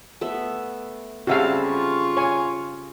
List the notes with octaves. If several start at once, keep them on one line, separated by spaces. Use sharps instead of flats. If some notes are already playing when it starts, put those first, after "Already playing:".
A3 B3 E5
C#3 G3 C4 F#4 A4 E5 F5 A5
F4 C#6
C#5 G#5